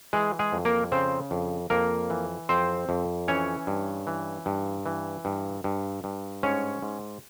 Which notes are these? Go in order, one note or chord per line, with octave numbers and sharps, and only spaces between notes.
E3 G#3 G#4
G#3 G#4
F2
A#3 A#4
C#3 C4 C5
F2
F2 A#3 A#4
E3
F2 C4 C5
F2
E3 C#4 C#5
G2
E3
G2
E3
G2
G2
G2
G#2 C#4 C#5
G#2